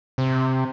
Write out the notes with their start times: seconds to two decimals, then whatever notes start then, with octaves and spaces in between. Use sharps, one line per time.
0.18 C3